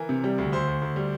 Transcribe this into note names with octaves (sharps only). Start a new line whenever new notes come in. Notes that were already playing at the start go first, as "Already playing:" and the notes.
Already playing: E3 A#4
C3
G3
D2
D2 C5
D2
D2
G3